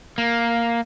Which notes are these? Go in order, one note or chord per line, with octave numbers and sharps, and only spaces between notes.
A#3